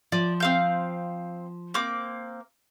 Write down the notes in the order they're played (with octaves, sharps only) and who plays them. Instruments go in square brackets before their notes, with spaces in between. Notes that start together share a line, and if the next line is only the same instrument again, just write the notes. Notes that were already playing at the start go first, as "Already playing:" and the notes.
[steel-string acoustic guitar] F3 [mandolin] D5
[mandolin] C4 F5 G6
A#3 C4 D6